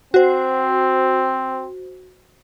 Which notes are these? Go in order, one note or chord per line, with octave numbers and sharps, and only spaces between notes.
C4 F#4 C5